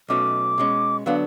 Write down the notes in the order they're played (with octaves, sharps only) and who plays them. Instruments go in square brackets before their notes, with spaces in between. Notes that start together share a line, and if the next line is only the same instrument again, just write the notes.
[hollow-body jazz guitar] B1 B2 A3 C#4 F#4 [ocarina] D6
[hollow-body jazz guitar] B2 G#3 C#4
[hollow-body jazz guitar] D3 F#3 B3 D4 [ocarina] F5